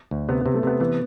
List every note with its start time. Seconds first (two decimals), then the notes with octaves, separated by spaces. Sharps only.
0.11 D2
0.29 C3 B3
0.41 B3
0.46 C3
0.54 A3
0.63 C3 B3
0.80 E3 B3